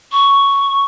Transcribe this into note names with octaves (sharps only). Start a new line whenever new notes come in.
C#6